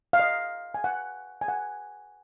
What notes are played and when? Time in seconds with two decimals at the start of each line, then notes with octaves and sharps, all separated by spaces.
0.13 F5
0.20 D#5
0.74 G#5
0.84 F#5
1.41 G#5
1.48 F#5